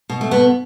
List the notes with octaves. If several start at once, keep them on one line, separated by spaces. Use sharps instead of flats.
B2
A3
G2 B3